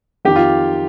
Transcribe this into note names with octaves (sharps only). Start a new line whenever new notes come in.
F2 D#3 G4
F4